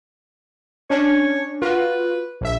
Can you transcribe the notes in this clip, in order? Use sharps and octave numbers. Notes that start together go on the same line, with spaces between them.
C#4 D4 C#5
F4 F#4 B4
A#1 E5